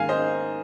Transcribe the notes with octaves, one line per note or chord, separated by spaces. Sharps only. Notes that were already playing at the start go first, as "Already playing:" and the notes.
Already playing: G#2 D#3 A#3 F5 G#5
C5 D#5